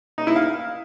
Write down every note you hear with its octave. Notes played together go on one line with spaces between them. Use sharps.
D#4
E4
F5